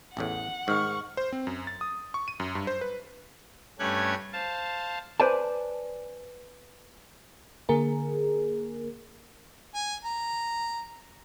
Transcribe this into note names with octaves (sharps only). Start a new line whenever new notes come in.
A1 E2 A2 F#5
G#2 D#3 C#6 F6
C5
C4
F#2
A6
D#6
C#6
D#7
F#2
G2
C5
B4
G2 A3 C#4 G4 F#6 G#6
C5 F5 A5
B4 C5 D5 G#5 A5
D3 A#3 G#4 A#4
G#5
A#5